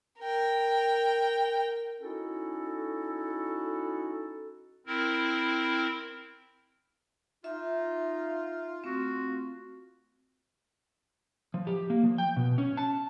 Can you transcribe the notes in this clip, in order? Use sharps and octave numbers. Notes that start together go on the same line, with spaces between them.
A#4 G5
C#4 D#4 E4 F#4 A4
C4 E4 A#4
D#4 F4 E5
A3 C4 F#4
F3
G4
A#3
F3
G5
B2
C#4
A5